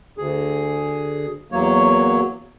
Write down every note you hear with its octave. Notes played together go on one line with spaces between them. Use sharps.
D2 G#4
E2 F#3 A#3 C#5